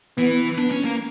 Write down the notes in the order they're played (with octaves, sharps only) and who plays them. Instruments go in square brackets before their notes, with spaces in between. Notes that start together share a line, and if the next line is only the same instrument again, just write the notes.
[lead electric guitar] E3 [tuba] B3
[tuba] B3 [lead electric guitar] D4
[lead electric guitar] C#4
A#3